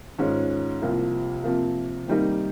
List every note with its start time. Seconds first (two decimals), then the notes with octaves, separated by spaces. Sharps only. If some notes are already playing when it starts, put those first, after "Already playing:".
0.18 G#2 D#3 G#3 C#4 F4
0.82 C2 C3 F3 A#3 F4
1.44 C3 F3 A#3
2.07 C3 D#3 G3 A#3 D#4